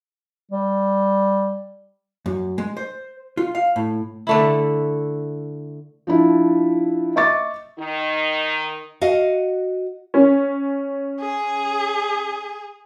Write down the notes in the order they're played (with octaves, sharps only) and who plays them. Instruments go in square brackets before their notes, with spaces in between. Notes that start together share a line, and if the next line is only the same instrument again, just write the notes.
[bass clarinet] G3
[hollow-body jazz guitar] F#2
G#3
C5
F4
F5
A2
[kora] D3 A3 E4
[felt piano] F3 D4 E4
D#5 E5 C#6 D6 A6
[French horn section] D#3 D#4
[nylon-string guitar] F#4 D#5 F5 F#5
[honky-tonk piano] C#4
[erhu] G#4